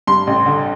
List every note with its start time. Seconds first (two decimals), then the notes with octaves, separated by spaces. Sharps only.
0.07 G2 C6
0.27 A1
0.46 D3